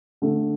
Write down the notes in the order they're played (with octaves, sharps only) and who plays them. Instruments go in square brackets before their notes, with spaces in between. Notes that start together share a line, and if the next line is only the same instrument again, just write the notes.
[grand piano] D3 A3